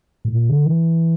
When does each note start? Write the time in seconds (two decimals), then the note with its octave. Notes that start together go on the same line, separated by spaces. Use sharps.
0.25 A2
0.33 A#2
0.49 D3
0.66 E3